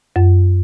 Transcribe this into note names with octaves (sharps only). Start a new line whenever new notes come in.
F#2